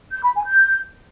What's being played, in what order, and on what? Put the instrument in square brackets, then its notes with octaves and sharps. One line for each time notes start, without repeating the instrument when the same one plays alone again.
[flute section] G6
B5
G#5
G6